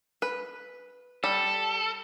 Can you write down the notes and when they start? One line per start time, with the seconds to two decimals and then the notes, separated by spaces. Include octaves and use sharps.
0.22 B4
1.24 G3 A4